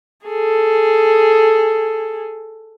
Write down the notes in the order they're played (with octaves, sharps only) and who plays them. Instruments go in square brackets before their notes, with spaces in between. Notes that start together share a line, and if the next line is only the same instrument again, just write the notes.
[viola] G#4 A4